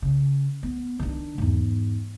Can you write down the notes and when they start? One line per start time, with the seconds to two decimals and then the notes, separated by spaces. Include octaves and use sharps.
0.02 C#3
0.63 B3
1.00 D#3 D4
1.38 E2 G#2